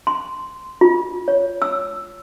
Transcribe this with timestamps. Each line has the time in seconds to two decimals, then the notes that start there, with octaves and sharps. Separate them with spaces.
0.07 C6
0.81 F4
1.28 C#5
1.62 E6